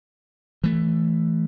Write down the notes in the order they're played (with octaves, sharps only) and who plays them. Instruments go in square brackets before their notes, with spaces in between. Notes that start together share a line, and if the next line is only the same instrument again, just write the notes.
[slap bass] E3 A3